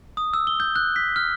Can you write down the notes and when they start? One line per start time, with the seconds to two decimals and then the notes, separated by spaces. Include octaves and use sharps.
0.17 D#6
0.34 E6
0.47 G7
0.60 G6
0.76 F#6
0.96 B6
1.16 F6